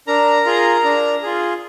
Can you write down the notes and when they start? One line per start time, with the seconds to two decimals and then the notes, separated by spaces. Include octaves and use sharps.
0.07 D4 A#4 A#5
0.46 F4 G#4
0.84 D4
1.23 F4 G#4